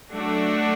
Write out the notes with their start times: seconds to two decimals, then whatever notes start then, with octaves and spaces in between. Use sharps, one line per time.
0.13 F#3 A3 D4 F#4 A4